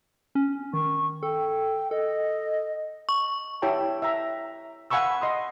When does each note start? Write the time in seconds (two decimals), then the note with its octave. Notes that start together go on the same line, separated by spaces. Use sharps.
0.35 C#4
0.74 D#3 C#6
1.23 A4 G5
1.91 A4 D#5
3.09 C#6
3.62 E4 G4 C#5 G5 A5
4.02 E5 G5 A#5
4.90 F5 F#5 G#5 B5 C#6 E6
5.21 D#5 C6 D#6